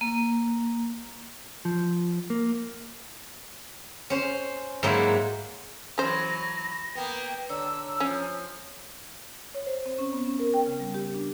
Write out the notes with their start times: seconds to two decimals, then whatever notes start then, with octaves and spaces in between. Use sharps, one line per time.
0.01 A#3
1.65 F3
2.30 A#3
4.10 C#4 C5
4.83 G#2 F#3 A#3 E4
5.98 E3 F#3 C#4 C5 B5 A#6
6.95 A#3 B3 B4 G5
7.49 D3 C#5 A#5 E6
8.00 F3 C#4
9.54 C#5
9.67 C5
9.86 C4
9.98 C#4
10.13 B3
10.26 C#4
10.39 A#4
10.54 G5
10.66 C#3
10.80 G3
10.94 G4
11.14 D4